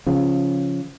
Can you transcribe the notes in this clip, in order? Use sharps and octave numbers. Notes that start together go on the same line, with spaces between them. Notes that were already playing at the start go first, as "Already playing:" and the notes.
C#3 F3